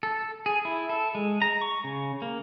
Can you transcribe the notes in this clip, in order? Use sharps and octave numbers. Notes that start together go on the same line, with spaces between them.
A4
G#4
E4
A4
G#3
A#5
C#6
C#3
A#3